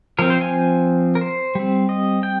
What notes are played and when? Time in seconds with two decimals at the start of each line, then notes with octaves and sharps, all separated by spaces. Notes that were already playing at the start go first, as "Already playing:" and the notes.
0.19 F3 C4 A#4
0.30 C5
0.41 G#5
1.15 A#4
1.21 C5
1.55 G3 C4
1.89 D#5
2.23 G5